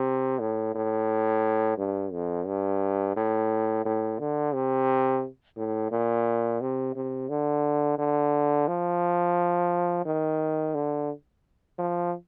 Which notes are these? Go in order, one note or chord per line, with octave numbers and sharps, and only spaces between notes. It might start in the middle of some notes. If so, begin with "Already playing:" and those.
Already playing: C3
A2
A2
G2
F2
G2
A2
A2
D3
C3
A2
A#2
C3
C3
D3
D3
F3
D#3
D3
F3